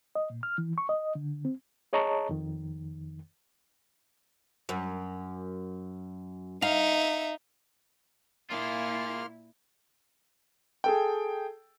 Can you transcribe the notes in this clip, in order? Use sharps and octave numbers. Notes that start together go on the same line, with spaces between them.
D#5
A#2
F6
E3
C#6
D#5
D3
C4
G#4 C#5 D#5 A5 A#5 C#6
F2 D#3
F#2
D#4 E5 F5
A#2 A#3 E4 F4 G#4 C6 F6
G#4 A4 G5